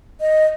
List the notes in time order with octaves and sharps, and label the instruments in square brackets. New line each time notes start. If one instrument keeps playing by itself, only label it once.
[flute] D#5